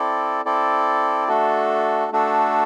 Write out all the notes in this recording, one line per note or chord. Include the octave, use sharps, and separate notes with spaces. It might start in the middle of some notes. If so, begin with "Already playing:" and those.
Already playing: C4 E4 A4 D5
C4 E4 A4 D5
A3 D4 F#4 A4
A3 D4 F#4 A4